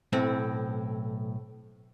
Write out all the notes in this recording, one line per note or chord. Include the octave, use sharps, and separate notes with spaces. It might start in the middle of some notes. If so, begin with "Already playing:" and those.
B1 A2 C4